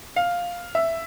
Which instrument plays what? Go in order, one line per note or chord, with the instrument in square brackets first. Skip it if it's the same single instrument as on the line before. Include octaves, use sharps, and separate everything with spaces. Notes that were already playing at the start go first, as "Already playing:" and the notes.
[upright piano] F5
E5